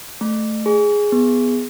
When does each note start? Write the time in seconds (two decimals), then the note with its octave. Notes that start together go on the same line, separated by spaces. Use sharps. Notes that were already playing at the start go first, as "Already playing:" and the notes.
0.21 A3
0.66 G#4
1.12 B3